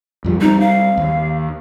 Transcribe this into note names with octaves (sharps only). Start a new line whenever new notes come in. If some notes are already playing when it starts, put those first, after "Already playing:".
F2 F3 G3
G3 C4 D#4
F5
D#2